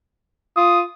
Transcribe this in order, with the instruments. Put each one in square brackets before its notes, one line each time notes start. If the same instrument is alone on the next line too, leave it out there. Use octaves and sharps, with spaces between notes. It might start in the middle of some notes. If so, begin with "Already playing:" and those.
[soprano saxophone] F4 [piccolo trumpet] D#6